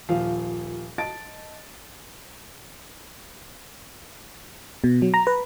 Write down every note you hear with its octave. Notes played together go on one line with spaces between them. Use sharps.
D#1 F3 F5
D#5 A5 A6 D7
B2
F#3
A#5
B4